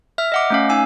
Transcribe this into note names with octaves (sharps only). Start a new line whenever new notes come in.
E5 F6
D#5 F#5 D6
A3 C#4 F5
D#4 G#5 E6